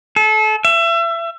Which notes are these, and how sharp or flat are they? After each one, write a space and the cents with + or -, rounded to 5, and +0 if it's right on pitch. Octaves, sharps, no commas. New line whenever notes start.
A4 -30
E5 +30